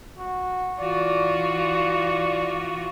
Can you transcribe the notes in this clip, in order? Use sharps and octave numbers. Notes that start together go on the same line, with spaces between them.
F#4
E3 F4 F#4 D5